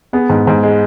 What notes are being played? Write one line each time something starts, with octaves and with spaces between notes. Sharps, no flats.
B3 G#4
G#2
G#2
G#3